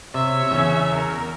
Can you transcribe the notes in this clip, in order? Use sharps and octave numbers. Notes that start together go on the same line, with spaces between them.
C3 C#5 E5
E2 C#3 C#4 E6
A#4